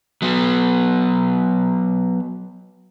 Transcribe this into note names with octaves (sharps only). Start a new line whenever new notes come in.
F#3 B3